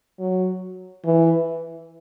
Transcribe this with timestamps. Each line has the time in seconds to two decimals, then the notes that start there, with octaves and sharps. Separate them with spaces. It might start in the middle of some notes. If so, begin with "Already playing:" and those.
0.19 F#3
1.05 E3